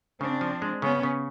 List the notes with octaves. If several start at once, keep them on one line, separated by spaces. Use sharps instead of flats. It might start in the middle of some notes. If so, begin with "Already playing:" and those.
C#3 C4 D4
F3
G#3
C#3 B3 C#4
C#3